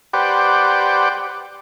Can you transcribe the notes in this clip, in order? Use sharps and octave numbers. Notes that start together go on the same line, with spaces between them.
G4 B4 C5 D5 F#5 G5